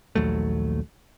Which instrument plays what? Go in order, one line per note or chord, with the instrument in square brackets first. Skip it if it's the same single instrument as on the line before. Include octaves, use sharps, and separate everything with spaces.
[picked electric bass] A#1 D#2 F#3 A3